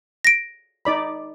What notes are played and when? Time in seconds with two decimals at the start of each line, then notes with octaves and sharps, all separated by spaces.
0.25 A#6 D7
0.85 D#4 D5 B5